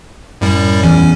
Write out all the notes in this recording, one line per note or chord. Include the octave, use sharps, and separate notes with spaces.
F#2 A2 G3
E2 C#4